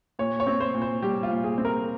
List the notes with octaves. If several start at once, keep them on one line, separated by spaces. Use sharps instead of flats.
A#2 C#5
C#5
C4
C5
A#2
C5
G3 G4
F4
A#2
G#4
C4
A#4